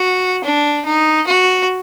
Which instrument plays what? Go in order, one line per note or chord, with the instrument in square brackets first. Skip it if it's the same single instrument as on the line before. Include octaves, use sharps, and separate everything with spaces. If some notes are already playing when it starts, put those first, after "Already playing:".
Already playing: [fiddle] F#4
D4
D#4
F#4